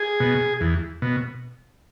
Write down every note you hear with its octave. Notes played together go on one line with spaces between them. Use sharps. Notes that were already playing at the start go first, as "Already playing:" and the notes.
Already playing: G#4
B2
E2
B2